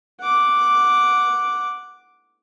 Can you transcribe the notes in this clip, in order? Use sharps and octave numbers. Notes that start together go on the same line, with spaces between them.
F#5 D6